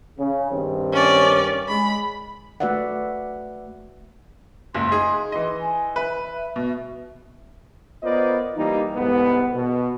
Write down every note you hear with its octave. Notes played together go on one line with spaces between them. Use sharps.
C#3
G2 D#3 C4
C#4 D5
G#3 B5
A3 F#4 B4 D5 E5 F#5
F#1 C#2 C6
D#4 G#4
E3 D#5 C6
G#5
B4 E5
B2
B3 F4 A#4 C5 D5 D#5
E3 G3 A#3 D#4
C2 G#2 B3
B2